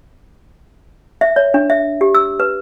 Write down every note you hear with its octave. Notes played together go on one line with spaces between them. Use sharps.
E5
C#5
D4
E5
G4
E6
B4